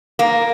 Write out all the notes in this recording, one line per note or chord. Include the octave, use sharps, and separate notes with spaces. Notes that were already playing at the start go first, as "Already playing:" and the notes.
A#3